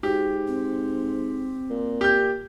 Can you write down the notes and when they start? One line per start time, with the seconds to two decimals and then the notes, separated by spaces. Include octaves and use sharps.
0.03 G#2 F#4 G4
0.47 C4
1.70 A#2
2.01 G4 G6